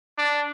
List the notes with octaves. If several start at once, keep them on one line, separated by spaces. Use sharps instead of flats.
D4